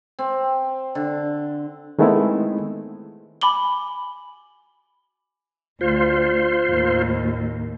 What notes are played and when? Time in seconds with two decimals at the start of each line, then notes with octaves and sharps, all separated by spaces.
0.19 C4
0.95 D3
1.99 D#3 G#3 A3 B3 C4 E4
3.41 G#5 B5 D6 F#7 G7
5.81 D2 F4 C5
6.70 D#2 A2